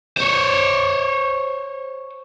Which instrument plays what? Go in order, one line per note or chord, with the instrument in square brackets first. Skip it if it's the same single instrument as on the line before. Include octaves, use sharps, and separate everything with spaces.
[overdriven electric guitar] C5 C#5